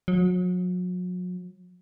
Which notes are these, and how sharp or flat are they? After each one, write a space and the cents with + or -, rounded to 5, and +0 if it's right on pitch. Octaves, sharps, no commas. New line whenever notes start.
F#3 -40